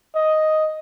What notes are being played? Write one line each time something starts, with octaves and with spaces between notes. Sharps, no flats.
D#5